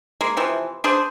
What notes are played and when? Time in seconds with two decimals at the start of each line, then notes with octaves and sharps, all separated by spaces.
0.21 G#3 A#3
0.37 C3 E3 F3
0.84 D4 G#4 C5